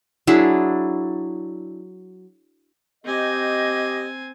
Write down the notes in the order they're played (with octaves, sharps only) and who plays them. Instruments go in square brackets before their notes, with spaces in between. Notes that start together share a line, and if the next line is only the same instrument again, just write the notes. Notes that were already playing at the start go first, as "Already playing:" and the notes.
[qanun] F#3 D4 E4 G#4
[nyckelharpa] C4 G#5 [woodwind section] G4 D#5